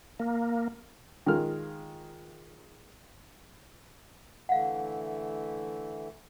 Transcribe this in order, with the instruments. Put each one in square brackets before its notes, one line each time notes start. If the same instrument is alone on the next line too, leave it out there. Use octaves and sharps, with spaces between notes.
[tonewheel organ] A#3
[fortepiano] D#3 G#3 F4 F6
[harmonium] D3 E3 A3 [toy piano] F5 F#5